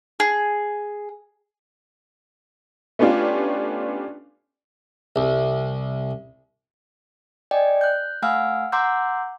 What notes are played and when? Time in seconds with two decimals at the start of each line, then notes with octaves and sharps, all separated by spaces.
0.20 G#4
2.99 A3 B3 C#4 D4 F4 G4
5.16 C2
7.51 D5 D#5 G5 G#5
7.81 F#6 G6
8.22 A3 F5 F#5 G#5 E6 F6
8.72 F#5 A#5 C6 D6 E6 G6